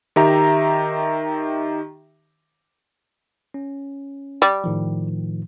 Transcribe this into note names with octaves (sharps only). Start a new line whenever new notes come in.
D#3 G4 E5 A#5
C#4
G3
A2 D#3 F3